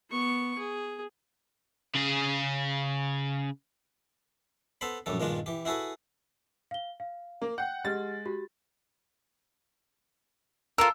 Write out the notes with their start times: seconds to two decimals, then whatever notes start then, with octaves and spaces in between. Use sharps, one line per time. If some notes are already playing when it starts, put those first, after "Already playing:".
0.11 B3 C#6
0.58 G#4
1.95 C#3 G#4
4.81 B3 A4 C5 B5
5.06 A#1 F#2 G3 A4
5.20 G2 A#2 D#3 G#3 D4 F4
5.46 E3 G4
5.65 E4 F#4 G#4 A4 B4
6.71 F5 G7
7.00 F5
7.41 A#3
7.58 F#5 G5 G6
7.85 G#3 G4 F#5 F6 A6
8.26 F#4 G4
10.78 F4 A4 A#4 E6